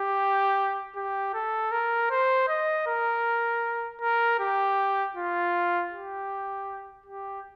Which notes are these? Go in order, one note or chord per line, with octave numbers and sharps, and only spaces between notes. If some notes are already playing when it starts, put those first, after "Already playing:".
Already playing: G4
G4
A4
A#4
C5
D#5
A#4
A#4
G4
F4
G4
G4